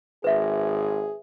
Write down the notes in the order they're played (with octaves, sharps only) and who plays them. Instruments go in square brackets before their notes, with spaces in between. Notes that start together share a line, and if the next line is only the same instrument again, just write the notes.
[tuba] G#1 [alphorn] G#4 [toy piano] B4 E5